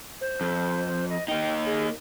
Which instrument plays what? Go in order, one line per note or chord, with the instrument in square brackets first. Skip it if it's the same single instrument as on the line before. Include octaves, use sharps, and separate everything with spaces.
[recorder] C5
[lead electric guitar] F2
[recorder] D#5
[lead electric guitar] A#3 D#4 [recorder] G5
[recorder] G#4